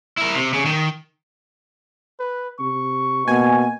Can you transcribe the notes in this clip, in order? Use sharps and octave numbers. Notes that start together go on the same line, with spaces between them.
E4 A#4
C3
C#3
D#3
B4
C3 C#6
B2 A#3 G#5